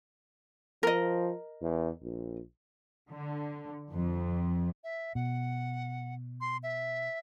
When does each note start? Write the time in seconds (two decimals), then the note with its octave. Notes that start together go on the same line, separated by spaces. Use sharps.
0.83 F3 A#4 D#5
1.62 E2
2.03 A#1
3.10 D3
3.92 F2
4.84 E5
5.15 B2 F#5
6.41 C6
6.63 E5